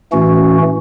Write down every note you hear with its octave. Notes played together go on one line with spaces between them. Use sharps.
A2 E3 A3 C#4 F#4